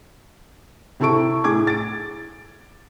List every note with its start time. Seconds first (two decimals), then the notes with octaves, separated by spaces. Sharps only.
1.00 C3 C4 E4 A4 C#6 D7
1.44 A2 G#4 D6 G#6
1.67 A6 D7